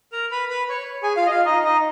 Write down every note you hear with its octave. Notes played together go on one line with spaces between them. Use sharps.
A#4 A#5
B4 B5
B4 B5
C#5 C#6
G#4 G#5
F4 F5
D#5
F4 F5
D#4 D#5
D#4 D#5